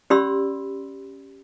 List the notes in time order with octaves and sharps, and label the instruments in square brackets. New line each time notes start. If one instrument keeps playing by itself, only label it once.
[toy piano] C#4 G4 D5 B5 C6 E6